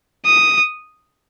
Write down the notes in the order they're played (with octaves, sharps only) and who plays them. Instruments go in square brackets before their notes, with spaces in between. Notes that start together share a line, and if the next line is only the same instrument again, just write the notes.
[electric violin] D#6